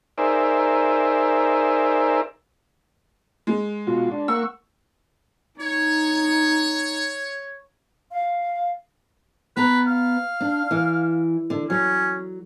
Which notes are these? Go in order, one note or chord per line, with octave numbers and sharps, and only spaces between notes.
D#4 G#4 A#4 C5 D5 E5
G#3
B2 F4 F#4
D4
A#3 F#5 C#6 E6
D#4 C#5
F5
B3 B4 A#5
F5
D4
E3
D3
F#3 C#4